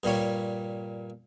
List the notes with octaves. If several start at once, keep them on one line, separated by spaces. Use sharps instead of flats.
G2 A#2 G3 C#5